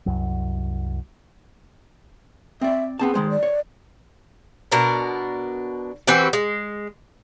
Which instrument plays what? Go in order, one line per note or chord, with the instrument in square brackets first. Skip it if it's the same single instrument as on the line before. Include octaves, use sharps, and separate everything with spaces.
[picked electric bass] C2 F#2 F#3
[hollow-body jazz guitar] C4 D5 [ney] E5
[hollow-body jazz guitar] B3 C4 A5 [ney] G#4
[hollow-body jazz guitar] D#3 G#3 C5
[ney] D5
[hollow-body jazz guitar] C#5
[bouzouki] B2 D4 A#4
E3 C4 F#4 G4
G#3